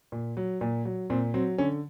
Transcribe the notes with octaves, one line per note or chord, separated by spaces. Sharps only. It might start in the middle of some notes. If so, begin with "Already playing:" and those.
A#2
F#3
A#2
F#3
A#2 C4
F#3 C4
D3 C#4